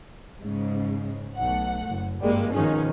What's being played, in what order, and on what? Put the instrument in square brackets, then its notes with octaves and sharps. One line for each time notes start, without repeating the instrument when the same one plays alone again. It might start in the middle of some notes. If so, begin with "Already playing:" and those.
[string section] G#2 C#3
[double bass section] B1 A3 [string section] F#5
[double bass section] F#1
[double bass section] G#1 G2 [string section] G3 G#3 A#3
[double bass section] B2 D#3 F3 [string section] C#4 D#4 G#4